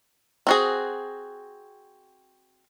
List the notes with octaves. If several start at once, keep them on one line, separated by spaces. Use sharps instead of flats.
C4 F#4 G#4